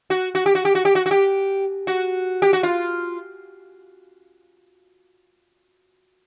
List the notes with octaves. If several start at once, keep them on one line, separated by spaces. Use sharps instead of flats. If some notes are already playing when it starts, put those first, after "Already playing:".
F#4
F#4
G4
F#4
G4
F#4
G4
F#4
F#4
G4
F#4
G4
F#4
F4